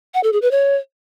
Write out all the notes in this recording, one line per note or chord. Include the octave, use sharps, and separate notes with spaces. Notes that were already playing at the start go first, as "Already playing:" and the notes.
F#5
A4
G#4
B4
C#5